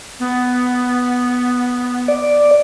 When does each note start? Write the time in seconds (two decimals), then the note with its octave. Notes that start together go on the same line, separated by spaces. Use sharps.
0.20 B3
2.08 D5